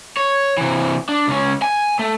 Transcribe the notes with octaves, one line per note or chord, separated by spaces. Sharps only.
C#5
C3 E3
D4
C#2 C#4
G#5
A3